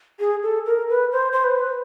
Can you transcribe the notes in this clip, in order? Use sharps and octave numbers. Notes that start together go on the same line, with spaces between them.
G#4
A4
A#4
B4
C5
C5
B4